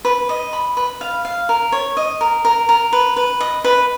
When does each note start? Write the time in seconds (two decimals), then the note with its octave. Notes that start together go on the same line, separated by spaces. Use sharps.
0.05 B4
0.29 D#5
0.53 B5
0.77 B4
1.01 F5
1.25 F5
1.49 A#4
1.72 C#5
1.97 D#5
2.21 A#4
2.45 A#4
2.69 A#4
2.93 B4
3.16 B4
3.40 D#5
3.64 B4